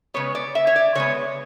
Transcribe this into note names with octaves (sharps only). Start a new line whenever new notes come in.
C#3 G#3 B3 C#5
D5
E5
C#5
D5
C#3 G#3 B3 C#5